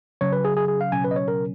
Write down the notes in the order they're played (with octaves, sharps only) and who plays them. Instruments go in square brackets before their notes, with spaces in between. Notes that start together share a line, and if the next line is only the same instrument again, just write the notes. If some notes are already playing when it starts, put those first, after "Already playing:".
[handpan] C#3 F#3 C#4 [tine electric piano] C#5
[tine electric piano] B4
G#4
G#4
G#4
F5
[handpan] B2 F#3 C#4 [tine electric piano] G#5
[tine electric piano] B4
D#5
C#5
A#4